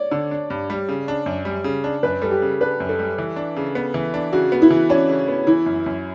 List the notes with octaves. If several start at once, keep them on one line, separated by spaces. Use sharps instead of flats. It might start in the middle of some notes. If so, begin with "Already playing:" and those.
Already playing: C#5 D5
D3
D4
G2
G3
C#3
D4
F#2
G3
C#3
D4
F#2 B4
G3 A4
G4
C#3
D4 B4
F#2
A4
G3
E3
D4
C#3
B3
E3
D4
C#3 F#4
B3
E4
E3
C#4 D4
C#3
B3
E3 E4
F#2
F#2